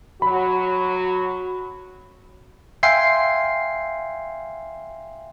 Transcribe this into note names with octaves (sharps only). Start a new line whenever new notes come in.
F#3 F#4 B5
E5 F5 G5 G#5 C6 C7